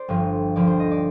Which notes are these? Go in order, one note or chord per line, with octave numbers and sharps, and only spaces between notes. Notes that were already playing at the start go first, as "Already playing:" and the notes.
Already playing: C5 D5
G1 G2 F3
D#2 D3 F3 D5
C5
D#5
D5